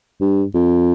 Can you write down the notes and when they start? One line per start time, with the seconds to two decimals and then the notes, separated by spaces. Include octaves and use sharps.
0.21 G2
0.54 F2